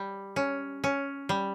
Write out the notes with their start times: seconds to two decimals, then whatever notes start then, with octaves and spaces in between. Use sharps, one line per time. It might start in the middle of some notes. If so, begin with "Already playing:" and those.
Already playing: G3
0.36 C#4
0.84 C#4
1.29 G3